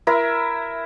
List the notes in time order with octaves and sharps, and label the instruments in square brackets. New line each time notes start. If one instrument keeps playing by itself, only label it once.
[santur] E4 A#4 E5